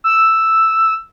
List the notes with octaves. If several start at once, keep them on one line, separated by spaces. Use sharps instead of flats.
E6